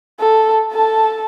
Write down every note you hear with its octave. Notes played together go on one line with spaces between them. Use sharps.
A4
A4 A5